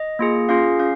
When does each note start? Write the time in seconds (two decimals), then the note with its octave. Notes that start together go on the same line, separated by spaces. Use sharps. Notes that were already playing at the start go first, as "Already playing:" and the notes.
Already playing: D#5
0.19 A#3 F4 G#4
0.49 C#4 F4 G#4 F5
0.79 C#4 F5